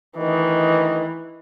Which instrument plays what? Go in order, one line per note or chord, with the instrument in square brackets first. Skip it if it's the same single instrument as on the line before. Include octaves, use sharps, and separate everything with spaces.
[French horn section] D2 D#3 D#5 [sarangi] E3